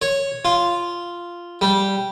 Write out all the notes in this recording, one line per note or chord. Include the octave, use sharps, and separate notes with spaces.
C#5
F4
G3